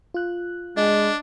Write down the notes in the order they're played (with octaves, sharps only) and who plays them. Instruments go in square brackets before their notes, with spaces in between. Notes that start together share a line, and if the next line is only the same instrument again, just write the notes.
[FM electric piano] F4 F#6
[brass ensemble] G#3 [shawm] D4 [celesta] D#5